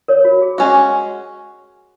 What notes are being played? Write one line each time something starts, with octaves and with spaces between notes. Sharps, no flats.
A#4 C#5
F#4
G#4
G#3 C#4 F#4 G#4